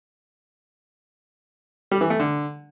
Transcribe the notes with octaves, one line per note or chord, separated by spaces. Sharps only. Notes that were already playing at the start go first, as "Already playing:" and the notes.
G3
E3
A3
D3